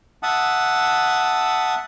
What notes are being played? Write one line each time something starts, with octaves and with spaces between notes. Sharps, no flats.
E5 F#5 A5 D#6